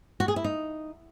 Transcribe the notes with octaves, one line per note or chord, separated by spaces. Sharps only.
F#4
G#4
E4
D#4